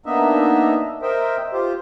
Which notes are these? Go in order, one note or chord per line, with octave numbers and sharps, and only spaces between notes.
A#3 B3 D4 D#4 D#5 E5
A#4 C5 D#5 E5 G5
F4 G4 C5